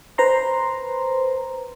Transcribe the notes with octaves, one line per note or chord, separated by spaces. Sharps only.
B4 C5 A#5 C6